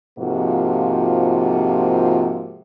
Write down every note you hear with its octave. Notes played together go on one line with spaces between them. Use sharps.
G#2 C3 F3 A#3 F4 F#4